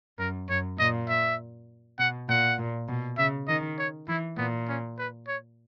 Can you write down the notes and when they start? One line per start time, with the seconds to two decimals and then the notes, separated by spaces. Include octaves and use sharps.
0.19 F#2 A#4
0.49 F#2 C#5
0.79 A#2 D#5
1.08 E5
1.99 B2 F#5
2.29 A#2 F#5
2.59 A#2
2.89 B2
3.18 C#3 E5
3.48 D#3 D#5
3.79 C#5
4.08 E3 E4
4.37 A#2 B3
4.69 C#4
4.99 B4
5.28 C#5